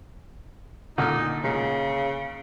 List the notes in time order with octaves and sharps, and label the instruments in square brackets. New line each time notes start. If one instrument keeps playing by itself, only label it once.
[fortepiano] A#2 D3 [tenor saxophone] D#4
[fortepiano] A#2 [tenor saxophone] C#3